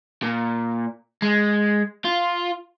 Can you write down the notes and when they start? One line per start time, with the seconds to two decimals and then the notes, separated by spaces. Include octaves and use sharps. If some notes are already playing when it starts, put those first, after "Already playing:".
0.22 A#2
1.22 G#3
2.05 F4